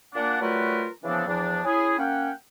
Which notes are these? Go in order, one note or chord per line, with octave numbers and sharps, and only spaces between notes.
A#2 A#3 D4 F#5
F#3 G3 A3 F4 A#4 B4
C#3 E3 F3 B3 C4 D4
E2 F3 D4
C#4 E4 G#4
A#3 C#4 F#5 G5